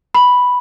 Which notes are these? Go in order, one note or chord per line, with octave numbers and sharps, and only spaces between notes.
B5